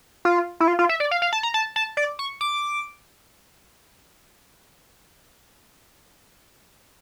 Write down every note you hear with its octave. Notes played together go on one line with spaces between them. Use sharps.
F4
E4
F4
F4
E5
D5
F5
F5
A5
A#5
A5
A5
D5
C#6
D6